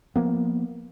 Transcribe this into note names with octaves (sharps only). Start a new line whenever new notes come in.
F3 A#3 B3